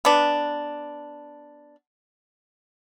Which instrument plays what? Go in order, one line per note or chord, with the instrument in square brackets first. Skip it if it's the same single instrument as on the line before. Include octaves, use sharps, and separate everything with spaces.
[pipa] B3 D4